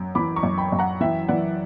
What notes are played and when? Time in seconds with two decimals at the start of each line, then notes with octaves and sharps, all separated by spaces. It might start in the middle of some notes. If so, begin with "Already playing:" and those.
Already playing: F#2
0.15 E3 B5 D6
0.36 A#5 C#6
0.43 F#2
0.58 G5 B5
0.72 F#2
0.79 F#5 A#5
1.01 E3 E5 G5
1.29 E3 D5 F#5